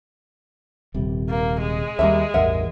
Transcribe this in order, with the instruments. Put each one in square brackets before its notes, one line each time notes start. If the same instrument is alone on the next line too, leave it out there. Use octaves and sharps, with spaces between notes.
[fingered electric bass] D#1 C3 G3
[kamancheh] A#3
G#3
[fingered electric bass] D#2 G3 [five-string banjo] A#3 C#4 E5
[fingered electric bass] A1 E2 G2 [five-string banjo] A#4 E5 F#5